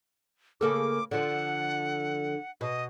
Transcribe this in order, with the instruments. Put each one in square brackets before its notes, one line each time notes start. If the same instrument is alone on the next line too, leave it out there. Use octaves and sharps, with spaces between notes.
[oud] C#3 A#3 A4 [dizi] D6
[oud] D3 F3 [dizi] F#5
[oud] B2 [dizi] D#5